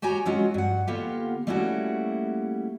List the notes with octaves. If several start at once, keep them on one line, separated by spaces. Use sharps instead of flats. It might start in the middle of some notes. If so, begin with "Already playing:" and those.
F#4 G4 C#5 G#5 A#5
F#3 G#3 C#4 F4 F#4
G2 F#5
D3 A#3 B3 F4 G4
G3 A3 A#3 C#4 E4 F#4